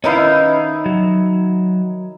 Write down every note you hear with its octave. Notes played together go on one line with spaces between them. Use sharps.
D#3 C#4 D#4 E4 B4 F5
F#3